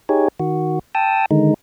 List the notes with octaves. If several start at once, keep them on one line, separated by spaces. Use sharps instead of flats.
D#4 G4 G#4 C#5
D#3 F#4
G5 A5 D#6 E6
D3 D#3 G#3 D#4